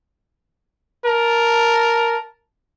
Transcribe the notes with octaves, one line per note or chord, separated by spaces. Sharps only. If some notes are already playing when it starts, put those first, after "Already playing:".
A#4 A5